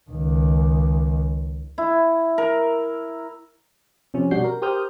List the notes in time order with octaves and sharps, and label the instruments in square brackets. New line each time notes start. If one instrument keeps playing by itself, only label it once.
[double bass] C#2 D#3
[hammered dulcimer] E4
A#4
[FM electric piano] C3 F3 C#4
B2 G3 D4 F#4 G6 C7
A#4
G4 A#4 C5 D#6 F6 G6